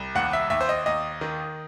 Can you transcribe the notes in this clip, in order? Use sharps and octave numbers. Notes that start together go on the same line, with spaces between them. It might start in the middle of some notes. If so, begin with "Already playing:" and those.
Already playing: C2
D#2 F#5
E5
D#2 E5
C5
D#5
D#2 D#5
D#3